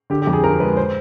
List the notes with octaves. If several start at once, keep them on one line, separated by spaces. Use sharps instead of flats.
D3 G4
G4
F2
G#4
F3 A#4
G#3 B4
C5